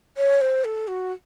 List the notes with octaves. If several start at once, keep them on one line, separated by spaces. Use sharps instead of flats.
C#5
C5
A4
F#4